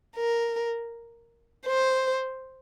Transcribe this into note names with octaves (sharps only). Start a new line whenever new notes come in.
A#4
C5